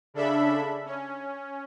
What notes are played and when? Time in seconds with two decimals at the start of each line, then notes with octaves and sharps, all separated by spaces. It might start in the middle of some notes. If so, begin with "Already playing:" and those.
0.14 C#3 D4 A4 E5 B5
0.86 C#4